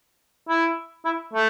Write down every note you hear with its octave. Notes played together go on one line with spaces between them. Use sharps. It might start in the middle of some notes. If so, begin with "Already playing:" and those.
E4
E4
A3